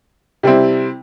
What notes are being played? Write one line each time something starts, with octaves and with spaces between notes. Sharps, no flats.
C3 G3 C4 E4